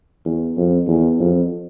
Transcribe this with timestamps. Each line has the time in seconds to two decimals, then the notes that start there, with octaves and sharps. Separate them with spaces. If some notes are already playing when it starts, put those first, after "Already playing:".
0.25 E2
0.57 F2
0.88 E2
1.20 F2